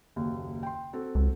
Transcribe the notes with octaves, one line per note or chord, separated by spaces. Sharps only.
F#1 D#2
G5 C6
C4 F#4 A4
C#2